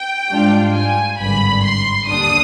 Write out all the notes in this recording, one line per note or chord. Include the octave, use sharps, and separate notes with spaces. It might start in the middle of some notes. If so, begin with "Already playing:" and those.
Already playing: G5
G#2 G3 D4 F4
G#5
G#1 G2 D3 B5
C6
D#2 D3 G3 D4 D#6